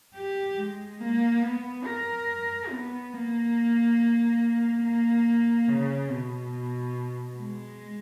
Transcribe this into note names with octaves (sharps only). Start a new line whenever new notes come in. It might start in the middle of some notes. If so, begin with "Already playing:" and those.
G4
G#3
A#3
B3
A#4
B3
A#3
A#3
C#3
B2
G#3